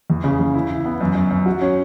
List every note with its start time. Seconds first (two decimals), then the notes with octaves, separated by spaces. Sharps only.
0.10 E2
0.24 C#3
0.39 E2
0.55 E4
0.70 E4
0.86 B3
1.01 F#2
1.15 F#2
1.31 F#2
1.46 F#4
1.62 C#4